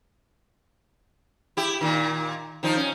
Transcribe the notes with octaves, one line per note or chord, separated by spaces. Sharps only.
E4 G4
A#2 D#3
D#3 F3 D#4
C#4